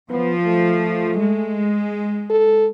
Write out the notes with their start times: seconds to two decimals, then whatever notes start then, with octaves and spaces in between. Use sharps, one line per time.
0.10 F3 B3
0.45 A3
1.19 G#3
2.30 A4